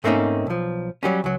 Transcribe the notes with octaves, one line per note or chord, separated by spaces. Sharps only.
G#2 A3 A#3 C4 C#4 D#4
B1 F3
F#3 G3 C#4
C#2 F#3